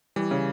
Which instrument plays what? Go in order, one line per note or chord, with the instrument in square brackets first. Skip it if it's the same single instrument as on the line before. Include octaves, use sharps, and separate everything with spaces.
[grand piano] E3 [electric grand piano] G3
[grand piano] C#3